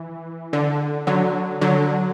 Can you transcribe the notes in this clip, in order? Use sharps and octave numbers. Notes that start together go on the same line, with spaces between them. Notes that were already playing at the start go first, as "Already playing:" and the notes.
Already playing: E3
D3
D3 F#3
D3 F#3